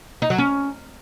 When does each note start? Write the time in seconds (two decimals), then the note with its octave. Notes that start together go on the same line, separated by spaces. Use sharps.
0.22 D#4
0.30 F#3
0.38 C#4